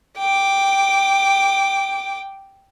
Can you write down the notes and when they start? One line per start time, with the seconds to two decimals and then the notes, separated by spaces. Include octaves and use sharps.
0.17 G5 D6